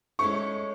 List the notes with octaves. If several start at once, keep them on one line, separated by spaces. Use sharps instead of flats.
G#3 C#4 E4 A4 C5 C#6